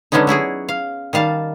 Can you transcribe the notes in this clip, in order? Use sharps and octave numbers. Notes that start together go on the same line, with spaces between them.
D3 F#3 G#3 B3 C#4 D#4
F#3 E4 F#4 G#4
F5
D#3 G3 F5 A5